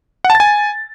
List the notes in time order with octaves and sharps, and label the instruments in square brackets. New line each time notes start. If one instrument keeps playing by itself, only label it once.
[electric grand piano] F#5
A5
A6
G#5